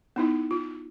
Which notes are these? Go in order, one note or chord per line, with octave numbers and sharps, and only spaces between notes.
B3 D#4 E4
F4